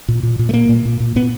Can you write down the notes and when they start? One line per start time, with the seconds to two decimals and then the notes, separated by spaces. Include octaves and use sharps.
0.08 A#2
0.23 A#2
0.39 A#2
0.49 A3
0.54 A#2 A#3
0.69 A#2
0.85 A#2
1.00 A#2
1.16 A#2 B3